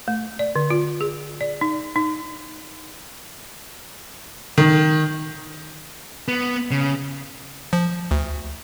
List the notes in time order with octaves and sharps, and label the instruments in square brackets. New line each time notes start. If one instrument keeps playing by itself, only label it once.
[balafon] A3
D5
D3
F4
G#4
D5
D#4
D#4
[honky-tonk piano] D#3
[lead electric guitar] B3
C#3
[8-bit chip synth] F3
D2